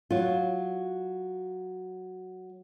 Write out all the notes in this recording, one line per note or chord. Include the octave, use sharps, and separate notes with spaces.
F#3 F4